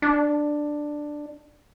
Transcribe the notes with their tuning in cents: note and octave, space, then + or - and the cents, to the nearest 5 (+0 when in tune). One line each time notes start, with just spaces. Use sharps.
D4 +10